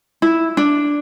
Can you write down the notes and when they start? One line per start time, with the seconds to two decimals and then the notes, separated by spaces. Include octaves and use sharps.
0.22 E4
0.57 D4